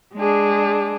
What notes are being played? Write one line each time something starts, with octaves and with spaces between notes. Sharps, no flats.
G#3 D4 G#4